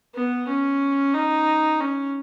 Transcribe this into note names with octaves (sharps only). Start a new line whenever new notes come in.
B3
C#4
D#4
C#4